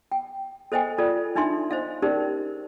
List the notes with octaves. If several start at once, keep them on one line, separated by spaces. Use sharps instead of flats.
G5
A4 C5 D#5 G5 G#5
F4 A4 D5
D4 D#4 E5 G#5 C6
C5 D#5 F5
C#4 D#4 G4 A#4 C5 D5